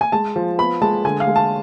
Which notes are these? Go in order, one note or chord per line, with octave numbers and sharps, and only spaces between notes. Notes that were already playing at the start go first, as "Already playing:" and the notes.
G#5
G#3 A5
F3
B3 B5
G#3 A5
D3 G#5
F5
G#3
A5